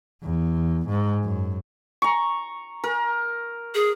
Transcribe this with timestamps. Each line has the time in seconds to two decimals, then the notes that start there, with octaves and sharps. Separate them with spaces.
0.22 E2
0.88 G#2
1.23 F#2
2.02 A#5 C#6
2.84 A#4
3.75 G#4